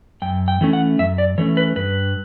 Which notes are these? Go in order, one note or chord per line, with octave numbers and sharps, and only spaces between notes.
F#2 G5
G5
E3 A3 C#4
F#5
F#2 E5
D5
E3 A3 C#4 C#5
B4
G2 B4